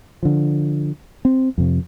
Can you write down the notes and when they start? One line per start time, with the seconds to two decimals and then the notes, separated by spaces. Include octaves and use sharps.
0.23 D3 F3
1.25 C4
1.58 F2 C3